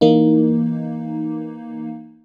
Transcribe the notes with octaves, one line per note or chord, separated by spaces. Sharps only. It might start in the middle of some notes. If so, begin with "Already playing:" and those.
E3 A#3 D#4